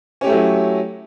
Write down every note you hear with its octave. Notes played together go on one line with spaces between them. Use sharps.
F#3 A3 C#4 E4 G4